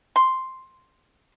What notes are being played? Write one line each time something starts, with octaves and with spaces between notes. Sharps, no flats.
C6